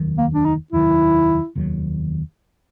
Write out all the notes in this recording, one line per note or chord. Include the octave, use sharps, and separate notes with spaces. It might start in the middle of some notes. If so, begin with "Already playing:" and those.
Already playing: F1 D#2 D#3 F#3
A#3
D4
D#4
F1 D#2 D#3 F#3 E4
F1 D#2 D#3 F#3